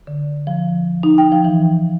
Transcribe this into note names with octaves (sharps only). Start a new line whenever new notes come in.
D3
F3
D#4
G5
F3
E3